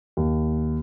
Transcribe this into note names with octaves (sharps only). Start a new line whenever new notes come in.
D#2